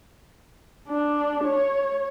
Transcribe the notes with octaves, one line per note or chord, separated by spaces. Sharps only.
D4
C#5